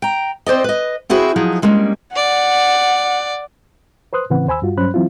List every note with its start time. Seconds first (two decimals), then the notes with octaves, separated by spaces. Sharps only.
0.02 G5 A#5
0.46 C4 C5 D5 D#5
0.64 B4 D#5
1.09 C4 E4 F#4 G#4 C5
1.36 F3 F#3 D#4 G#4
1.62 G3 G#3 A#3 C#4 D4
2.16 D5 F#5
4.13 B4 C5 C6 D#6 F#6
4.30 A2 C#3 E3 C4 B4 F#5
4.47 D#2 C5 G#5 B5 E6
4.62 G2 G3 F4 F#4
4.77 G2 F#3 C#4 C5 B5 F#6
4.94 E3 F#3 C4 E4 F4